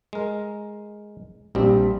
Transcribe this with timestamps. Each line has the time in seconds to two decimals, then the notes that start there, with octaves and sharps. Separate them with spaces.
0.13 G#3 A#4
1.55 A#1 G3 C4